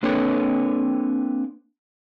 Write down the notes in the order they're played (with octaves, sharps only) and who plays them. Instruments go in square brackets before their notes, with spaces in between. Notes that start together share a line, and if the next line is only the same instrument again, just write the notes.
[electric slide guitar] A#3 C4 D4 A4 B4 C#5